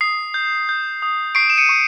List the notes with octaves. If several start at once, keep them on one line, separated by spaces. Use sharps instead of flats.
D#6 C7
G6
G6
D#6
C#6 C7 D7
E7
C#7 D#7
C#6